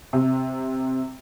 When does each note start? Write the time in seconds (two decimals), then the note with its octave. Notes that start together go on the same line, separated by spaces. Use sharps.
0.13 C3